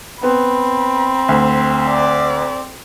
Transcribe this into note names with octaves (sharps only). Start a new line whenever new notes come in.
B3 C4 B5
D2
D5